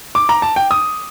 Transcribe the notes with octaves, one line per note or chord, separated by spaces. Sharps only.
D6
A#5
A5
G5
D#6